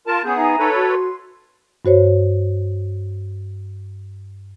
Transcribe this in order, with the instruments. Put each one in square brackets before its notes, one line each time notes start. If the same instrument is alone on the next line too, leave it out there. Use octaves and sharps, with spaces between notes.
[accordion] F4 A#4 A5
[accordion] B3 G#4 [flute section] C#4 G6
[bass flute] D#4 [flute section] E5 G#5 A#5
[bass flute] D#4 [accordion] A4 B4 C#5
[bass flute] F#4 [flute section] D5
[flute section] C6
[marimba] G2 F#4 C5 C#5